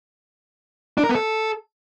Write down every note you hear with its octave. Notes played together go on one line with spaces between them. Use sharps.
D4
A#4
B3
A4